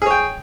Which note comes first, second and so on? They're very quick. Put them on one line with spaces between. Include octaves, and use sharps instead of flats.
G#4 C#5 G5